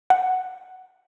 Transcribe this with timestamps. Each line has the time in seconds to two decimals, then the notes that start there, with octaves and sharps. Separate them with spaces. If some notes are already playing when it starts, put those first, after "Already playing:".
0.10 F#5